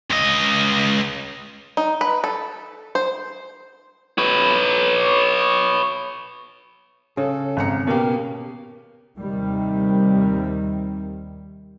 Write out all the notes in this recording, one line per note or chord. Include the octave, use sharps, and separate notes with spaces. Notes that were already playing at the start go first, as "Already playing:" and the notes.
C#2 D#5
D#4
B4
A4
C5
B4 C#5
C#3 A4
G#1 A#5 C#7
B2 A#3 G4
D#2 C3 D#3 G3